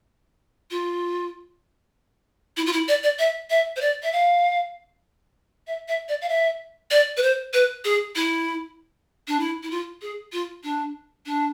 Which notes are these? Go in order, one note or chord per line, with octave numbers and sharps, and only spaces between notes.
F4
E4
F4
E4
D5
D5
E5
E5
C5
D5
E5
F5
E5
E5
D5
F5
E5
D5
B4
C5
B4
G#4
E4
D4
E4
E4
F4
G#4
F4
D4
D4